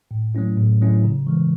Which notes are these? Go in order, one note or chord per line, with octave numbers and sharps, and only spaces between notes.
A2
F#3 A3 C#4 E4
A2
F#3 A3 C#4 E4
C#3
E3 G#3